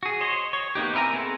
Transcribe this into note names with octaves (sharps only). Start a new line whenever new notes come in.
F#4 G#4
C5 C#5 D#5
C#5
A#3 B3 D#4 G4
C4 E4 A#4 G#5 A#5
B3 C4 G#4 A4 F#5